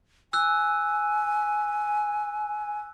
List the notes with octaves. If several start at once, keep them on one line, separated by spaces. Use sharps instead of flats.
G#5 E6 F#6